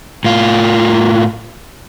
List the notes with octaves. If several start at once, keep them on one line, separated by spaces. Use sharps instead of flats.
A2 F4